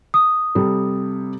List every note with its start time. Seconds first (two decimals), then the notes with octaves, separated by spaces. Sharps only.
0.14 D#6
0.55 C3 G3 A4